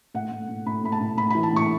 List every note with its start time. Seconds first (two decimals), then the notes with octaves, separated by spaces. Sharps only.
0.14 A2 F#5
0.31 A2
0.49 A2
0.66 A2 B5
0.84 A2 B5
0.92 A5
1.00 A2
1.17 A2 B5
1.30 B5
1.35 E3
1.43 A5
1.53 A2 C#6